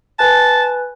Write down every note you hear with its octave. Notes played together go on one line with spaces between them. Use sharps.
B4 G#5 A5 F#6